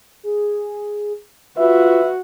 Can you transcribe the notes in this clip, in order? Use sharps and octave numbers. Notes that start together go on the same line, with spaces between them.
G#4
F4 F#4 B4 E5